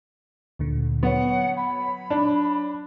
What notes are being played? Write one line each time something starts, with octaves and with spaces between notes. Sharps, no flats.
D2 A#2 D3
F#3 B3 C#5 F#5
B5
D4